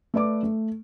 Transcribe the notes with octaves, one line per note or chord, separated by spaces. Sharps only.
A3 B4 D5 D6
A3